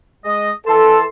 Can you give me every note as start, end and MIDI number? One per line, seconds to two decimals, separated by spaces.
0.24 0.52 56
0.24 0.52 75
0.67 1.05 52
0.67 1.03 69
0.67 1.05 81
0.67 1.05 84